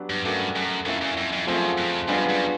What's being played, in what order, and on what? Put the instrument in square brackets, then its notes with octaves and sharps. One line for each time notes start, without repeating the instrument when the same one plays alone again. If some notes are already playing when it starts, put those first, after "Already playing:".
Already playing: [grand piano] F#3 B3 D4 G4 B4
[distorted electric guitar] G2
[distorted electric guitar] G2 [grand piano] A3 C#4 F#4 A#4
[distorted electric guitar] F#2
[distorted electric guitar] F2 [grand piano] A#3 C#4 E4
[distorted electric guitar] E2
F2
F2
[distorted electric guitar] F#2 [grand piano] F3 A3 C4 F4 G#4
[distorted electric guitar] F2
[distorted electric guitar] F#2 [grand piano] G3 B3 D4 F4 G#4
[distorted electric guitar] F#2